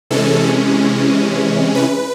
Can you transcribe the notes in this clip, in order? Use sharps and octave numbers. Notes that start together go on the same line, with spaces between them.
C3 E3 G#3 C#4 A4
B4